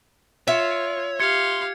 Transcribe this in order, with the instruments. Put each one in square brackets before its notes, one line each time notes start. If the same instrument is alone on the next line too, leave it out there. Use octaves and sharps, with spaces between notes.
[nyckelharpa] F4 [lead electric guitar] C#5 [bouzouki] E5
[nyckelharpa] G4 F5 [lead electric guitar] C6 [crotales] G#6 C#7